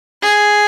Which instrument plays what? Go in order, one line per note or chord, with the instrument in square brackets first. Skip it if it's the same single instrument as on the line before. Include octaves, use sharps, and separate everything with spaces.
[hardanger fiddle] G#4